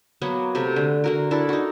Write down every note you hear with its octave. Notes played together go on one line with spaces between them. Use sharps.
F#3 A#3 B3 F#4
C3 A3
D3
D3 F#4 A#4
D4 E4 A4 A#4
D#4 F#4